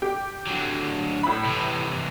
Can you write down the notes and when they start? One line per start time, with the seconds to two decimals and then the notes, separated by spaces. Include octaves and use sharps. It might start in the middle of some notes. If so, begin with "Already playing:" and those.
0.02 G4
0.47 D3 F#3
1.23 A2 B5
1.45 C3 E3